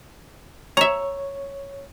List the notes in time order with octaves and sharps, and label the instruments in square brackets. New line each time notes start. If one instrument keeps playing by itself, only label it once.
[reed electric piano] C#5 [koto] E5 A#5